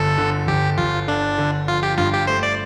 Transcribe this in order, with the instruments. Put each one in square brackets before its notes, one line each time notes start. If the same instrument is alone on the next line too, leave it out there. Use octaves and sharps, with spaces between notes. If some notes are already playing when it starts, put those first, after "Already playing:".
Already playing: [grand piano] G1 [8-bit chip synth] A4
[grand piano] D3
[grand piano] G1 [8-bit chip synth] G4
[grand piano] G1 [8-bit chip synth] F4
[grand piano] D3 [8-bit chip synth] D4
[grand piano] D3
[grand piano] F3 [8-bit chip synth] F4
[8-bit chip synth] G4
[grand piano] G2 [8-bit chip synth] F4
[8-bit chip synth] G4
[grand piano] A3 [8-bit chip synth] C5
[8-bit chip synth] D5